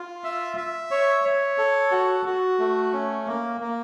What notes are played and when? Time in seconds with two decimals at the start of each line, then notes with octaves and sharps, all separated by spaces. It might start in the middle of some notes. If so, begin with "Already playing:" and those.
Already playing: F4
0.24 E5
0.57 E5
0.91 C#5
1.24 C#5
1.58 A4
1.91 F#4
2.26 F#4
2.60 A3
2.93 C#4
3.26 A#3
3.61 A#3